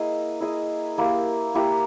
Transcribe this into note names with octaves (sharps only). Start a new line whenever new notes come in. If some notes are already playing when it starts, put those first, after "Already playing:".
Already playing: A#3 E4 G#4 A#4 D#5
E4 G#4 D#5
A#3 E4 G4
A#3 E4 G4